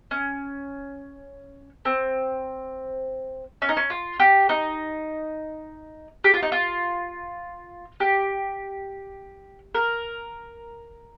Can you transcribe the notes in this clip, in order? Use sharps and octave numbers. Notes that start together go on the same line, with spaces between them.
C#4
C4
C#4
D#4
C#4
F4
G4
D#4
G4
F4
D#4
F4
G4
A#4